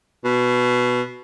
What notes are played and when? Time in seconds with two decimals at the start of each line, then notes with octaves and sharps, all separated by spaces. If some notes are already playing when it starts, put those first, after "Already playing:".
0.24 B2